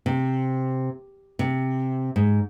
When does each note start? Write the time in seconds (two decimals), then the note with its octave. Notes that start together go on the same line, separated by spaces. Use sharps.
0.06 C3
1.39 C3
2.16 G#2